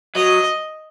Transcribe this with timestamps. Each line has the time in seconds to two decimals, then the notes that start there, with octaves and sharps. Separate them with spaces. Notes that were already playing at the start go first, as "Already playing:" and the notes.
0.15 F#3 D#5